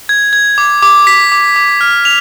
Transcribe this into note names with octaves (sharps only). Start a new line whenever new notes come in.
G#6
G#6
D6
D6
B6
D6
D6
F6
F7